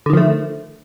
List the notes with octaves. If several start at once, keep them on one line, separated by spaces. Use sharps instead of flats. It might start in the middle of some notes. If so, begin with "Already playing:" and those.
D3 D#3 F3 A3